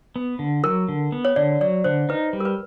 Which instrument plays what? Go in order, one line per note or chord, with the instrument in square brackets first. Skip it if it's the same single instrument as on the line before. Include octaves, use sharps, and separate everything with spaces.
[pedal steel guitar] B3
D3
[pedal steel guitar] F#3 [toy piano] A#4
[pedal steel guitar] D3
B3
[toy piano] C#5
[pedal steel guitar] D3 [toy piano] D5
[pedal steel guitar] F#3 [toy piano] D5
[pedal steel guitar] D3 [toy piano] C5
[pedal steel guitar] D#4 [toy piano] B4
[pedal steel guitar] G3
[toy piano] A#4
B4